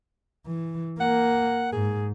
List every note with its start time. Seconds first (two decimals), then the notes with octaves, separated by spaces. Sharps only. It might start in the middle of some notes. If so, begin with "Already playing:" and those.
0.47 E3
1.00 A#3 F#5
1.72 G#2 G#4